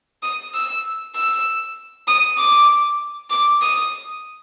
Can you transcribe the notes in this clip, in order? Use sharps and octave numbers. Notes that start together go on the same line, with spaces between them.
D#6
E6
E6
D#6
D6
D6
D#6